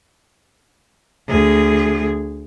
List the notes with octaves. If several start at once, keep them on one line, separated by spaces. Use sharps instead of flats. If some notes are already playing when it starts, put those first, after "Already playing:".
D2 G#4